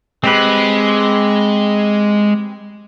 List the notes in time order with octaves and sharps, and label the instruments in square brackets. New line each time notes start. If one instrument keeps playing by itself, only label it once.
[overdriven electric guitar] G#3 [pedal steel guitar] C4 G4 B4